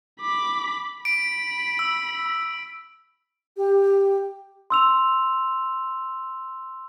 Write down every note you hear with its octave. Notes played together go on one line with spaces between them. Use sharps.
B5 D6
B5 B6 D7
E6
G4
C6 E6 F7